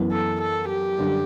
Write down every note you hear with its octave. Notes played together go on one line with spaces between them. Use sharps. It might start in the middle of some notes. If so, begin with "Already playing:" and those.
Already playing: F#2 E3 B3
A4
A4
G4
F#2 D3 G3